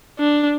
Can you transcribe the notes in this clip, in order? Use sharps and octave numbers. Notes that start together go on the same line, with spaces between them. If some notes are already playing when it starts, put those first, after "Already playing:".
D4